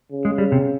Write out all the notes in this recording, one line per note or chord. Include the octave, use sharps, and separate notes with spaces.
C#3
G#3
G3
C3